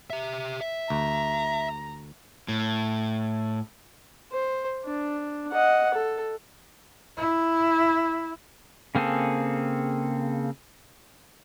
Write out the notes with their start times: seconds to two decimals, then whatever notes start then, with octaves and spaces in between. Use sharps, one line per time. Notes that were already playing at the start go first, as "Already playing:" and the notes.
0.10 G4 E5
0.61 E5
0.90 D2 A#5
2.48 A2
4.32 C5
4.85 D4
5.52 D#5 F#5
5.94 A4
7.18 E4
8.95 C#3 A#3 C4 G#4 A4